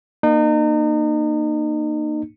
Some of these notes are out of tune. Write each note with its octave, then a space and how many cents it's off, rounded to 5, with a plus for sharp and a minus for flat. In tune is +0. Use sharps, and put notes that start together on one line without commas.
A#3 +0 D#4 -35